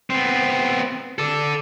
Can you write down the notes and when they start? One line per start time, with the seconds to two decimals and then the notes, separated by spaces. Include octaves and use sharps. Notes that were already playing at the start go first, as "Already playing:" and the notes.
0.10 B3 C4
1.19 A4 D5